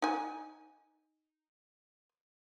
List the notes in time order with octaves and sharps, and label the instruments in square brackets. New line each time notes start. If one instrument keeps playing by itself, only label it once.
[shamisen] D#4 G#5